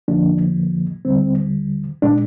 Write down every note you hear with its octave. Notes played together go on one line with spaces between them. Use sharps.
F2 D3 F3 A#3 D4
D#2 D3 G3 C4
A#2 G#3 D4